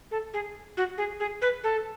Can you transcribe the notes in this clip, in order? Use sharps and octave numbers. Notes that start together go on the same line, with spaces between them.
A4
G#4
F#4
G#4
G#4
B4
A4